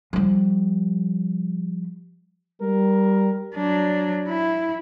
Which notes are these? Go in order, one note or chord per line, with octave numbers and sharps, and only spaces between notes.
F3 G3
G3 A#4
F#3 D4
E4